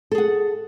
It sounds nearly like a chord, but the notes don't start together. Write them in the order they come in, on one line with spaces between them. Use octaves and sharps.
A4 G#4 F#5